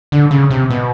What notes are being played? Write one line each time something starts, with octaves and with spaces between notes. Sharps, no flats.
D3
C#3
C3
B2